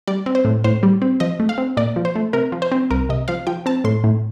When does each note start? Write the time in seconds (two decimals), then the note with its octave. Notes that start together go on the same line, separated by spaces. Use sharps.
0.07 G3 D5
0.26 C4
0.35 C5
0.45 A2
0.64 A2 C5
0.83 G3
1.02 C4
1.20 F3 D#5
1.40 A3
1.49 F5
1.58 C4
1.77 A#2 D5
1.96 F3
2.05 C5
2.15 A3
2.33 C3 A#4
2.52 F3
2.62 C5
2.72 C4
2.90 C2 A#4
3.09 C3 D#5
3.28 F3 F5
3.47 F3 G5
3.66 C4 A5
3.84 A2 C6
4.04 A2